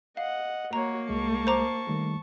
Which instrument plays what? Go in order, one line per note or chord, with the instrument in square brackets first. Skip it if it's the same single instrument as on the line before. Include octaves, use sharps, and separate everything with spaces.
[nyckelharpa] D#5 F#5 [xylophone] F5
[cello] A#3 [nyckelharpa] F#4 C#5 [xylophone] A#5
[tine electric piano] C2 G#3 [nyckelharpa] A5 C#6
[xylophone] C5 A#5 D6
[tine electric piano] D#3 G3 A3